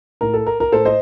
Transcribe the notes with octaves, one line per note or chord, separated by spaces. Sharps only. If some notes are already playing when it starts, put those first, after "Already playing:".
A2 A#4
A4
A#4
A#4
A2 A4 C5
C5 D#5